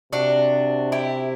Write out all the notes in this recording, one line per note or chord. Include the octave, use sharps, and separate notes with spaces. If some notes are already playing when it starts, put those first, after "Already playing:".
C3 D4 F#4
E4 G4